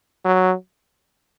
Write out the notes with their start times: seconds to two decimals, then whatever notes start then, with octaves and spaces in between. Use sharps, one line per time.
0.25 F#3